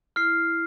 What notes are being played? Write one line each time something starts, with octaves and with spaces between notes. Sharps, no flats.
E4 F6 C7